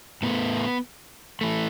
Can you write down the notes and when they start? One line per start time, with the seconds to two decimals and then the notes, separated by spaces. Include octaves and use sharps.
0.23 A2 A3 B3
1.41 E3 A3